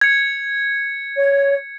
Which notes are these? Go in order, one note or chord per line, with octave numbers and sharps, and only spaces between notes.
G#6 C#7
C#5